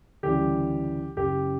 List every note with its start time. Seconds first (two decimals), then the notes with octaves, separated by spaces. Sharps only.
0.23 D2 C#3 E3 G3 G4
1.16 F#1 F#2 C#3 G4